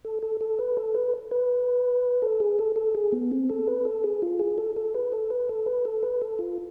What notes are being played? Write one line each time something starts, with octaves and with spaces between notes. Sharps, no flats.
A4
A4
A4
B4
A4
B4
B4
A4
G#4
A4
A4
G#4
B3
C4
A4
B4
A4
G#4
F4
G#4
A4
A4
B4
A4
B4
A4
B4
A4
B4
A4
F4